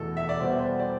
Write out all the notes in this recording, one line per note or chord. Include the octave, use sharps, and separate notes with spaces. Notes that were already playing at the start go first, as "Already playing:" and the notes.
Already playing: E2 B2 A3 A4
E5
D5
B2 G3 B3 C5
C5
D5